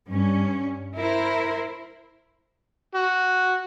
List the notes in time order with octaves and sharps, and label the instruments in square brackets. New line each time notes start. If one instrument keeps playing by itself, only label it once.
[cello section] G2 C#4
E4 A#4 C5
[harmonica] F#4